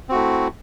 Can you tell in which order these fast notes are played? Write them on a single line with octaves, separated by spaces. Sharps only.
C4 F#4 A3 E4